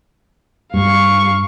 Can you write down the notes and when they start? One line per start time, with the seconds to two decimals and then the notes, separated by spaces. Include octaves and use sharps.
0.74 G2 F5 C#6